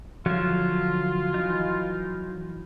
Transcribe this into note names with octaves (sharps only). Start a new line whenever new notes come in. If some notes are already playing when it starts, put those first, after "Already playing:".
D3 F3 F#3 F4 E5
E3 D#4